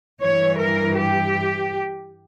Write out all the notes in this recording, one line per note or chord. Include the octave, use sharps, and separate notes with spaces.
G2 E3 C#5
A#4
G4